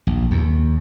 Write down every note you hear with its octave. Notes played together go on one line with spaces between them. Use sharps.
A#1
D#2